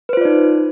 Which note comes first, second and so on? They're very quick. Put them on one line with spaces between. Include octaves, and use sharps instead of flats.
B4 C5 F4 D5 D#4